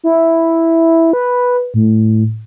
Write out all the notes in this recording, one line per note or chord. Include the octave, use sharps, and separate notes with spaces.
E4
B4
A2